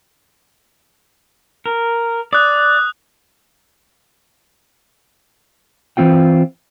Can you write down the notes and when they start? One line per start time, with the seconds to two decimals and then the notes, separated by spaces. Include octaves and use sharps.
1.66 A#4
2.33 D5 D#6 F#6
5.97 E3 A#3 C4 F4 G5